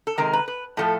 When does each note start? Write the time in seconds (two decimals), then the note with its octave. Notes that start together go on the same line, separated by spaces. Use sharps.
0.07 A4
0.18 C3 D#3 G#3 A#4
0.33 B4
0.48 B4
0.77 A2 F3 A3 A4